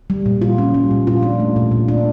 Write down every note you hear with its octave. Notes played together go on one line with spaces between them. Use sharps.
G3
A#2
F4
C#4
G3
A#2
F4
D4
A3
A#2
A#2
D4